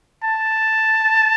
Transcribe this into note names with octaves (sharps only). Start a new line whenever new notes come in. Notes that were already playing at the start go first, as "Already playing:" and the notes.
A5